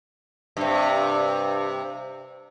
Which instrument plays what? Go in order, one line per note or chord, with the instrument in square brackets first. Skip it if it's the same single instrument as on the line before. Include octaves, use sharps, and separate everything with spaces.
[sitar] G2 C3